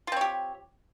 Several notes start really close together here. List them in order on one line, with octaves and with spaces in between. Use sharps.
F4 C4 C#5 G4